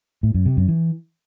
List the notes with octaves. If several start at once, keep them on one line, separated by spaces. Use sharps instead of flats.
A2
F#2
C3
F#2
E3